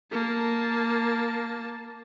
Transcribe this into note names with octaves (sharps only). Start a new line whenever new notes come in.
A#3 A5